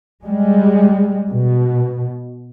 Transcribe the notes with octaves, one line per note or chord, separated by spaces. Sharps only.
G3 G#3
B2